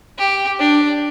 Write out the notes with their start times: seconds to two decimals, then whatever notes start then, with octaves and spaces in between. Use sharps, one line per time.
0.18 G4
0.59 D4